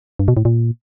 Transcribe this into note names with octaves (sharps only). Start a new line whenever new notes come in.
G2
B2
A2
A#2